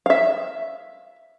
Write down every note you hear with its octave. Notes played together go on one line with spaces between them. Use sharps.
E5 F5